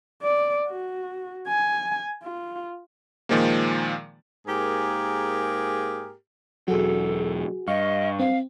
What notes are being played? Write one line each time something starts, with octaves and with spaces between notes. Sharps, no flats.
D5
F#4
G#5
F4
A#2 D#3 F3 G#3 A#3
G#2 A#3 G4 G#4 A#4
E1 F#3 F#4 G#4 A4
G2 D#5 F5 C#6
C4 F5